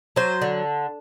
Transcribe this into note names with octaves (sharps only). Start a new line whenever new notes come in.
F#3 C5
D3